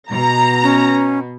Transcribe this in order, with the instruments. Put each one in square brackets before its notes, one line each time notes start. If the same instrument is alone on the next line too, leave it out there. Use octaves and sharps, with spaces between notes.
[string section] B2 [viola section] A#5
[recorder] C#4